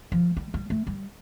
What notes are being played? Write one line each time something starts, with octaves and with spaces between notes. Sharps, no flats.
F3
G3
G3
A3
G3